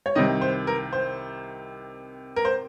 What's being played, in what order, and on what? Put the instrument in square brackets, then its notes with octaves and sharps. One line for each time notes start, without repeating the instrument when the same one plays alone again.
[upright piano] C#5
C2 C3 D#3 D#5
C5
A#4
C5
A#4
C5